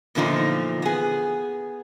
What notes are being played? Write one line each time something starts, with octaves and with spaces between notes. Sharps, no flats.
E2 A#2 D3 F3 D#4
B3 G#4